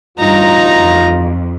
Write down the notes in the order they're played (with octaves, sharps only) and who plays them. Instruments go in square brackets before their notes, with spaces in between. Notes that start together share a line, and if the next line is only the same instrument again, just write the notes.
[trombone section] A1 D2 F4 [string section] G2 [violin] D#4 A#5
[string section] F2